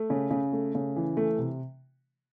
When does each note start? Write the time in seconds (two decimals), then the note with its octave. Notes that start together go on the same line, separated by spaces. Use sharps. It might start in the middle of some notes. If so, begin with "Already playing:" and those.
Already playing: A3
0.10 C#3
0.31 C#3
0.53 A3
0.75 C#3
0.96 E3
1.17 A3
1.38 C3